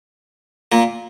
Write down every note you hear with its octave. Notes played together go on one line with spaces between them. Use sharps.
A#2 A#3